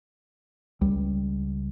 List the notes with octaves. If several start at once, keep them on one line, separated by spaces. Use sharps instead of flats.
C#2 G3